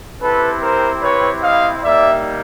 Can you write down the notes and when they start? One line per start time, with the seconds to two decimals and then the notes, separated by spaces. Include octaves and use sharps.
0.21 C4 E4 G4 A4 B4
0.62 A#4 C5
1.02 B4 C#5
1.42 D#5 F5
1.83 G3 A#3 D#4 G4 D5 E5